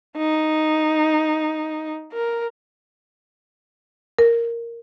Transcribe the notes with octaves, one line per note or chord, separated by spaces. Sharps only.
D#4
A#4
A#4